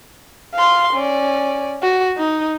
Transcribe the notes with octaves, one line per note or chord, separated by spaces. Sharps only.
F5 C6
C#4 D5
F#4
D#4